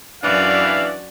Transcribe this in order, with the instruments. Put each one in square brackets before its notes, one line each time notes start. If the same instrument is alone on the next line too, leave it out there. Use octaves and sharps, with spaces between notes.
[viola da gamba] F#2 F#4 D5 [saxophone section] E3 D4 [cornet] F5